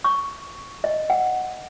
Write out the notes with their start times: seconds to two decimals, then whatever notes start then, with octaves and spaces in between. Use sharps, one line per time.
0.04 C#6
0.84 D#5
1.10 F#5